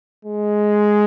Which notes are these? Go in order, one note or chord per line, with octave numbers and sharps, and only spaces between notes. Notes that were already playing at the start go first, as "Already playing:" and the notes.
G#3